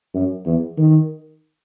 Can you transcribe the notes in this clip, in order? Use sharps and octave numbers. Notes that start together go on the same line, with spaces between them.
F#2
E2
D#3